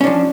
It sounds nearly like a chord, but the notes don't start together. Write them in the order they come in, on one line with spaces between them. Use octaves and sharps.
C#4 D4 F3